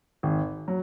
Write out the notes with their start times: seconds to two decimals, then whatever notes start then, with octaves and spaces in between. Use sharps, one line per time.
0.23 G#1
0.68 F#3